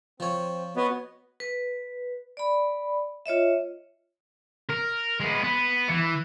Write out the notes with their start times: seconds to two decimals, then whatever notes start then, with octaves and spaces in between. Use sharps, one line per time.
0.20 F3 C4 C#5
0.76 B3 F#4 C#5 D#5
1.40 B4
2.37 D5 B5
3.26 F4 C#5 D#5 E5
4.69 A#4
5.20 G#3 B3
5.43 B3
5.89 E3